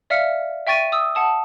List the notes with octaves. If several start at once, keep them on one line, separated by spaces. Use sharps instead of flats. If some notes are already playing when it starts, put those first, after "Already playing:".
D5 E5 F5 F6 C#7
E5 G5 C#6 A6 D#7
D#6 E6
F#5 A5 D#6